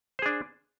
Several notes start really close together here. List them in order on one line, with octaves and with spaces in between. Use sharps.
C5 G#4 D4